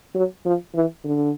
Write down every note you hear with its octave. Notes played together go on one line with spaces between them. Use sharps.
F#3
F3
E3
D3